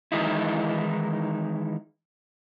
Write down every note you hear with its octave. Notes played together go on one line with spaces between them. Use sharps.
D#3 E3 G#3 D#4 E4